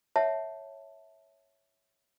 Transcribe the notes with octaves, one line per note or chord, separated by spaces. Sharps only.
C#5 E5 F#5 A5